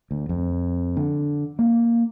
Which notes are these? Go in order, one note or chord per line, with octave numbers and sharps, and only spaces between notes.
D2
F2
D3
A#3